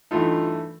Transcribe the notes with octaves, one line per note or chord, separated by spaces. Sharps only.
G2 E3 A3 D#4 F4